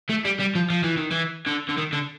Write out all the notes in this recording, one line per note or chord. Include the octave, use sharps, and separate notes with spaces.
A3
G3
G3
F3
F3
E3
D#3
E3
D3
D3
D#3
D3